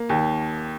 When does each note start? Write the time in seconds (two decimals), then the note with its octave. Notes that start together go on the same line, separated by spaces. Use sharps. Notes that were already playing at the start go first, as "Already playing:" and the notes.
Already playing: A#3
0.09 D#2